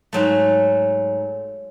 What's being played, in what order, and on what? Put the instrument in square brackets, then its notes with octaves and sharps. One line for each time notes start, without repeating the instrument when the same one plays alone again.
[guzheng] G#2 F#3 A3